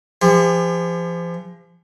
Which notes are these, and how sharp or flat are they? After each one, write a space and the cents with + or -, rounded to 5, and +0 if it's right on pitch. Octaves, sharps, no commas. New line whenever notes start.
F3 -35 G4 +45